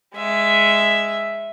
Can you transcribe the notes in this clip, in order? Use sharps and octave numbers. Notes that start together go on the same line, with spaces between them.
G#3 E5